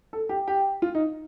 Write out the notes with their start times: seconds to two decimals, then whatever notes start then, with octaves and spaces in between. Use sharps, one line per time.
0.13 A4
0.29 G4
0.48 G4
0.82 F4
0.95 D#4